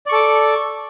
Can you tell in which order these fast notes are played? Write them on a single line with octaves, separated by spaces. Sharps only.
D5 C#6 A4 D6